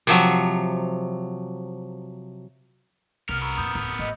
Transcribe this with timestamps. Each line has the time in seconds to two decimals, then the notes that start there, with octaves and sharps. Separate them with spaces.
0.07 C3 F3 F#3
3.29 C2 B3 A#4 F6
3.42 A#5 B5 C#6 E6
3.57 F2 A#2 B5 D#6 G6
3.75 D1 F2
3.99 A1 D#5